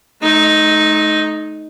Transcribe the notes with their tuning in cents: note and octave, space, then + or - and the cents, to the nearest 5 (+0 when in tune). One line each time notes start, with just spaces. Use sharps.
A3 -40 D#4 +0